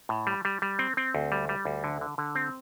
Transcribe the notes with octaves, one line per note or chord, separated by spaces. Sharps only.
A2
G3
G3
G3
C4
C4
D2
G3
G3
D2
D3
D3
D3
C4